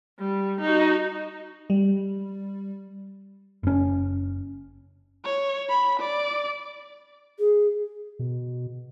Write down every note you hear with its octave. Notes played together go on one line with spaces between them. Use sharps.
G3
D#4 F#4
G3
F#1 C#4
C#5
B5
D5
G#4
B2